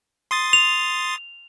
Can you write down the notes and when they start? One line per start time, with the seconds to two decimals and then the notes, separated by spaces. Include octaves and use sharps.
0.31 C6 D#6 A6
0.53 F7